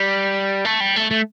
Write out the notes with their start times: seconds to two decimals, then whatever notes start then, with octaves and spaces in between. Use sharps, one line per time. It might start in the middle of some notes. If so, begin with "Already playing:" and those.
Already playing: G3
0.65 A3
0.80 G3
0.96 A3
1.11 A3